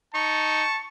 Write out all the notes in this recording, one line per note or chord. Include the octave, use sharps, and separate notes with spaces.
D#4 A5 C#6